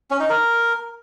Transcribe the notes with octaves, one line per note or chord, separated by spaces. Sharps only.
C#4
D#4
A#4